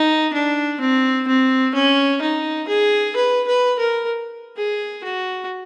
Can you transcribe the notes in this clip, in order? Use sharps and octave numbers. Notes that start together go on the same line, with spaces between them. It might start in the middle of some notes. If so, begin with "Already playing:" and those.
Already playing: D#4
D4
C4
C4
C#4
D#4
G#4
B4
B4
A#4
G#4
F#4